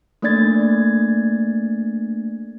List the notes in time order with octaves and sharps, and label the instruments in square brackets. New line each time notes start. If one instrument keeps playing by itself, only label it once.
[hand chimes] A3 A#3 D4 D5 G#6 A6